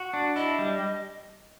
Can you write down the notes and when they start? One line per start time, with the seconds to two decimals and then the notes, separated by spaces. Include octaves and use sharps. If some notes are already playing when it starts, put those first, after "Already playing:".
Already playing: F#4
0.13 D4
0.36 E4 D#5
0.59 G3